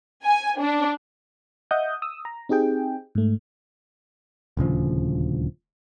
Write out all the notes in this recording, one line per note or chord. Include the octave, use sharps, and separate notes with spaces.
G#5
D4
D#5 E5 F#5 D#6 G6
D#6 E6
A#5
C4 D#4 G4 G#4 G5
G#2 A3
D#1 D2 C#3 F3